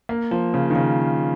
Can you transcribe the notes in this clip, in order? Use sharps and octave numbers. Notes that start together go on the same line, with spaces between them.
A#3
F3
C#3
D#3
C#3